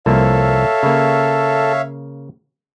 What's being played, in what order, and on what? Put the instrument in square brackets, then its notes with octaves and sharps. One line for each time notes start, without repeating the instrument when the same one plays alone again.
[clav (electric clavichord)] C2 F3 A#3 [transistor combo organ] A4 [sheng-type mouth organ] C#5 E5 F5
[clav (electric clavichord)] C#3 A#3